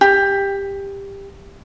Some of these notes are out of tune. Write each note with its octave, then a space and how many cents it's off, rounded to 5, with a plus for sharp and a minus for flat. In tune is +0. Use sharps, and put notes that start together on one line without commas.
G4 +15